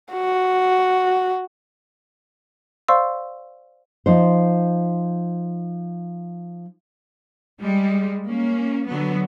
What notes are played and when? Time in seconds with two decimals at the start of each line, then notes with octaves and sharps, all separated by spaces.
0.13 F#4
2.88 C5 D5 F5 C6 C#6 E6
4.06 F3 D#4 C5
7.61 G3 G#3
8.26 A#3 C#4
8.87 D3 F#3 B3